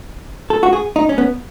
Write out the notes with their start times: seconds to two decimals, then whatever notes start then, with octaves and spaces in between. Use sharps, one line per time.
0.50 A4
0.63 F#4
0.73 G#4
0.96 D#4
1.09 C#4
1.18 B3